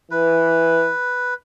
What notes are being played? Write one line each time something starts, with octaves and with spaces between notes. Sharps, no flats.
E3 B4